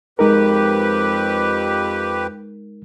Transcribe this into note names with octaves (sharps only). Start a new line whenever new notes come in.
F2 G#3 D#4 G4 A#4 B4